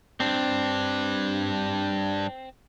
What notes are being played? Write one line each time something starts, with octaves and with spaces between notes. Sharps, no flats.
G2 C4 D4